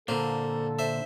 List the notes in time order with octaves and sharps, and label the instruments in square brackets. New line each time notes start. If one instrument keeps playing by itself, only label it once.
[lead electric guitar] A#2 D3 [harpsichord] A#3 C5 [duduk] A4
[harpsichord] C5 E5